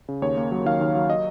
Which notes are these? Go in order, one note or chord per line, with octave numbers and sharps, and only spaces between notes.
C#3
D#2 C#5
A#3
F#3
D#3 F5
D#2
F#3
D#5